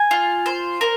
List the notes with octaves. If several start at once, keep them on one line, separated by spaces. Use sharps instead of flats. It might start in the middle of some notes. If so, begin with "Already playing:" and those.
Already playing: G#5
F4
C5
A#4